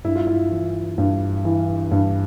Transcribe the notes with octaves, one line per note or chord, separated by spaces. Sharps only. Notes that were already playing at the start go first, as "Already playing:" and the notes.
G2 E4
F4
E4
E3
G2
E3
G2